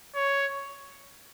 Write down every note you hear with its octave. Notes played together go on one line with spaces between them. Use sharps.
C#5